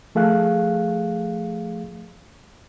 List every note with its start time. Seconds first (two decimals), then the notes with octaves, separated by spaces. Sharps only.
0.15 F3 A3 G#4 F5 F#6